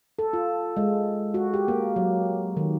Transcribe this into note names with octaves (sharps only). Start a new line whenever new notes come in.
A4
F4
G#3
F#4
G4
A#3
F#3
D#3